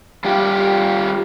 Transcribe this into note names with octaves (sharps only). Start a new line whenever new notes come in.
G3 F4 G4